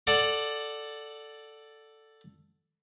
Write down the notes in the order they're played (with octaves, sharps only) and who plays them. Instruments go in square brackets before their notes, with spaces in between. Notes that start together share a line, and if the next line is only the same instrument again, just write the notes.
[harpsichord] A4 D5 F#5